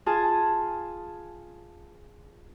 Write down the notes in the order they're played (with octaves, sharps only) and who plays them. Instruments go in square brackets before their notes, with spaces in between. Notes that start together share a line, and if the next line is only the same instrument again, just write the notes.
[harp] F4 G#4 G#5 A5